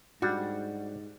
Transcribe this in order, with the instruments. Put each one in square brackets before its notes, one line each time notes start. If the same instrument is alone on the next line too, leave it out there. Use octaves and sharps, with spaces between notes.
[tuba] G#2 [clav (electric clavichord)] G3 D4 [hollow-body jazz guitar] F#4